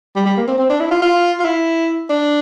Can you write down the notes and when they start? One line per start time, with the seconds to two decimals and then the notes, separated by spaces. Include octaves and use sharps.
0.16 G3
0.26 G3
0.37 A#3
0.48 C4
0.58 C4
0.70 D4
0.80 E4
0.91 F4
1.02 F4
1.40 F4
1.45 E4
2.09 D4